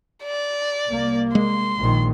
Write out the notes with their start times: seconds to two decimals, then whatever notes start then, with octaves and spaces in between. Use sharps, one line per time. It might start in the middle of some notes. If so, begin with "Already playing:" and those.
0.24 D5
0.90 C2 A#3
1.35 G#3 C6
1.78 A#1 D#3